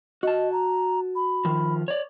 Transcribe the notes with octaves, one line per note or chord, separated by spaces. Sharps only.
F#4 D#5 A5
A#5
B5
D#3 F3
C#5 D5